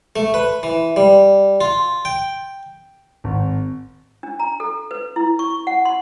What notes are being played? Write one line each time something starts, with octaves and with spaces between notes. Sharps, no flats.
A3
B4
E3
G3
F4
G5
G#1
D4
A#5
A4
B4
E4
C#6
F#5
C6